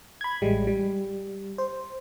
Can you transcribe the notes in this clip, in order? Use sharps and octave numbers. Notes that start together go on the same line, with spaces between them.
B5 G#6
A1 G3 G#3
G3
C5